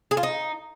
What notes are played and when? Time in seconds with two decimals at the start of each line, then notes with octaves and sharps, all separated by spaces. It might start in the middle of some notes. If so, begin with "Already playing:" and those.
0.11 G#4
0.17 F4
0.23 D#4